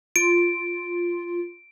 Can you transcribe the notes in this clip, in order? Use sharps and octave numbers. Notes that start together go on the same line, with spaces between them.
F4 D7